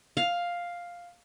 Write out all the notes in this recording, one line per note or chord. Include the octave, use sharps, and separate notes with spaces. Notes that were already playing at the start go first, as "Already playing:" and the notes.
F5